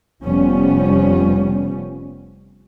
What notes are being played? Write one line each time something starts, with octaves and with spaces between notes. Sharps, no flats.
F1 F3 G3 B3 C#4